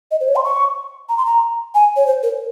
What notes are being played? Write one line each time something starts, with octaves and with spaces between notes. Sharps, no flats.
D#5
C5
C#5
C6
C#6
A#5
C6
A#5
G#5
C#5
C5
A#4